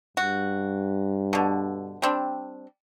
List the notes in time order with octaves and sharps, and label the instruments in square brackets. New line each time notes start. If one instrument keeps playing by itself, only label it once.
[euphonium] G2 [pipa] F#4
[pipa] B2 D3
G3 C4 D4